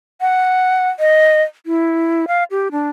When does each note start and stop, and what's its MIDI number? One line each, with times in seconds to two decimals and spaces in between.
0.21 0.89 78
1.00 1.42 75
1.66 2.25 64
2.28 2.44 77
2.51 2.68 67
2.72 2.90 62